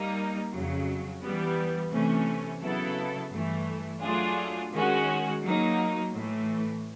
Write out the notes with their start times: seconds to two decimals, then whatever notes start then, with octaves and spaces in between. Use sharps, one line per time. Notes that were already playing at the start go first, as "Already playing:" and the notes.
Already playing: G3 A#3 D#4
0.51 F2 C#3 F#3
1.22 E3 G3 B3
1.91 C3 E3 A3 C#4
2.61 C#3 F#3 B3 E4 A4
3.32 G2 E3 A3
4.02 F#3 A3 D4 F4 G#4
4.73 D#3 G#3 C#4 F#4
5.43 F#3 A#3 D#4
6.14 A2 E3 A3